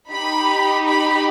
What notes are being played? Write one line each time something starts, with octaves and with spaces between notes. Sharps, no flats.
D#4 G4 B5
B5